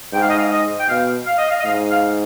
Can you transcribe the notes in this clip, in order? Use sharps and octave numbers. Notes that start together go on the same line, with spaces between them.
G#2 G5
F5
D#5
F5
D#5
G5
B2 F5
F5
D#5
F5
D#5
G#2 F5
F5